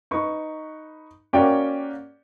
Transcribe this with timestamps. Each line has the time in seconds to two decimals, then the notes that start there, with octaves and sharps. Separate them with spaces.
0.11 D#4 B4 C#6
1.33 A#3 C#4 F#4 G4 D5 G5